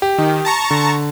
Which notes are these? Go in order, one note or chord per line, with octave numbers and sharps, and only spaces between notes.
G4
D#3
A5 A#5 C#6
D3